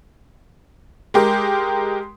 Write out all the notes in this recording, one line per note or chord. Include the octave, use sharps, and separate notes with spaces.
G#3 G4 A#4